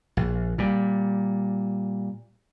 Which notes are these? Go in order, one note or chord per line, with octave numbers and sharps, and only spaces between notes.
A#1
A#2 G3